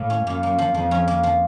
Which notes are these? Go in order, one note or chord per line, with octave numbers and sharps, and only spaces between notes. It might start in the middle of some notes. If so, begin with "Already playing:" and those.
Already playing: A2 A#3
C#4
F#2 A#3
A#3
F3
F2 F3
C#4
A#3
F3